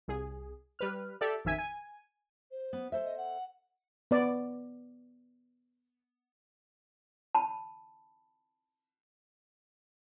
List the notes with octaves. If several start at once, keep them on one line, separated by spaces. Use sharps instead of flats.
C2 G#4
G3 B4 F6
G4 A4 D5 E5
A1 F2 D#3 E5 G#5 B6
G#5
C5
B3
A4 C5 E5
D#5
F#5
B3 D5
A5 B5